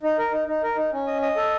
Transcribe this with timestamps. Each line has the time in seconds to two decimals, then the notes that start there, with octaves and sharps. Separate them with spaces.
0.03 D#4
0.18 A#4
0.32 D#4
0.48 D#4
0.63 A#4
0.77 D#4
0.93 C#4
1.07 D#5
1.22 D#5
1.36 A4